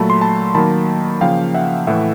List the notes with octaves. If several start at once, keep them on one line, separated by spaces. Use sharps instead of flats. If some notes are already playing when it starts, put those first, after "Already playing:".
Already playing: A#2 F#3 A3 A5 B5
C6
A5 B5
D#3 F#3 A#3 A5 B5
C#3 F3 A#3 F5 G5
E5 F#5
A2 E3 A3 E5 F#5